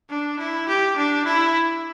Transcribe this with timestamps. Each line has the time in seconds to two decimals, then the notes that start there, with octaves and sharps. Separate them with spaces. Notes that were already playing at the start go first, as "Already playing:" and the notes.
0.10 D4
0.39 E4
0.68 G4
0.97 D4
1.26 E4